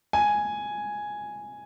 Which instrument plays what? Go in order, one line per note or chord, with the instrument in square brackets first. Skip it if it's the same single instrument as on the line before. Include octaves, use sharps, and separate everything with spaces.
[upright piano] G#5